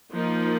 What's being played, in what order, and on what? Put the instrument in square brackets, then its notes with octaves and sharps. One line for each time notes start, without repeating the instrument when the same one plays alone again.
[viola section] F3 A#3 D#4 A#4